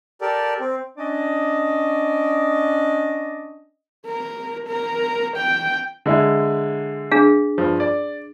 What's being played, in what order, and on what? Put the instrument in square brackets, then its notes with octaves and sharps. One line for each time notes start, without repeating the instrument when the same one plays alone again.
[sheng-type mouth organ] G4 A4 A#4 D5
C4
[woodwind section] C#4 D4 D5 D#5
[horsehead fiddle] A#4
A#4
G5
[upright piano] D3 G#3 E4
[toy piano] D4 G#4 F5
[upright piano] G2 F3
D5